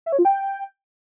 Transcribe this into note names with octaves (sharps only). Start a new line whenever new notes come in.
E5
C#5
F4
G5